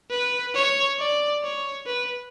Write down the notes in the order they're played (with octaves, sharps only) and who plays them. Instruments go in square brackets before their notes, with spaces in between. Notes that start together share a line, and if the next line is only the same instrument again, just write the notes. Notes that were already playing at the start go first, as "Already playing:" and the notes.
[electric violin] B4
C#5
D5
C#5
B4